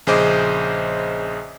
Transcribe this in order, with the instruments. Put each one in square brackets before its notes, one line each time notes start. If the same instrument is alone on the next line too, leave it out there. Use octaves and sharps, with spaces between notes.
[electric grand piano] A#1 C#3 G#4 C5 D#5 D6